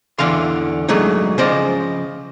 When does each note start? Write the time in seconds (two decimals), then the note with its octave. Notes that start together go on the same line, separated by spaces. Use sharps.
0.19 E2 D3 E3 F5 C6
0.89 F#3 G#3 A3 D4 D#4
1.38 C#3 F3 C5 D5 D#5